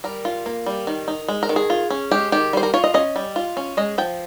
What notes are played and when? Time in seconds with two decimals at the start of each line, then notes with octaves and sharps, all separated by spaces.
0.04 G3 A#4
0.25 F4
0.46 A#3
0.66 G3
0.87 D#3
1.08 D#4
1.28 G#3
1.43 A#4
1.49 D#3
1.56 G#4
1.70 F4
1.90 C#4
2.11 G#3 G4
2.32 D#3 G4
2.53 G3 C5
2.63 A#4
2.74 F4 C#5
2.84 D#5
2.94 C#4 D#5
3.16 G3
3.36 F4
3.57 C#4
3.77 G#3 D#5
3.98 F3 G5